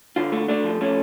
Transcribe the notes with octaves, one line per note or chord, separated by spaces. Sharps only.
D3 F4
A3
A3 D4
F3
A3 C#4